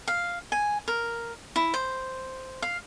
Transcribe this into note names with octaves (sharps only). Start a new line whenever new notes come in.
F5
G#5
A#4
E4
C5
F5